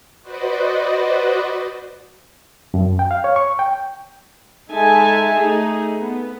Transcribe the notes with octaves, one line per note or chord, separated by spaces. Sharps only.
F#4 B4 C5 D5 D#5
F#2
G5
F5
C#5
C#6
G5
G#3 D#4 A4 E5 G#5 A5
A3 D#4 G#4
B3